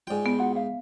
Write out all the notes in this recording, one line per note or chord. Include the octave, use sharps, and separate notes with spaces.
G#2 F4 D5 G5 G#5
B3
F4 F#4 F#5
E5 F5